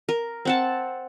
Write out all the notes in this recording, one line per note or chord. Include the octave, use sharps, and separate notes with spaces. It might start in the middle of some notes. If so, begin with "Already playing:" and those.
A#4
C4 F#5 A5